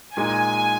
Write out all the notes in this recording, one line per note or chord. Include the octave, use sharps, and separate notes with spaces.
A#2 G#3 D#4 G#5